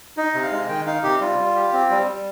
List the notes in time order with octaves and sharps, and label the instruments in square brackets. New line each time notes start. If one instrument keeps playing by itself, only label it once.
[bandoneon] D#4 [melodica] D#5
[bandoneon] C3
[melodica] F5
[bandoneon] G#3
[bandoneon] D#3 [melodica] G5
[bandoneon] D#4 [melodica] F5
[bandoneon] C3 [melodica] G4
[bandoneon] G3 [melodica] F4
[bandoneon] G3
G4
C4
G3
G3